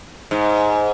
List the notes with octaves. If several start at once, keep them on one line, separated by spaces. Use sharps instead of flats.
G#2